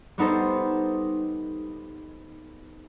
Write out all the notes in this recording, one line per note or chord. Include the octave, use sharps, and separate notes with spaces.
G3 B3 D#4 A4 C5